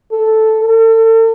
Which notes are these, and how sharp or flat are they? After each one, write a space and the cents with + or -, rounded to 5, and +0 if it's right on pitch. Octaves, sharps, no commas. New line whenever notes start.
A4 -5
A4 +40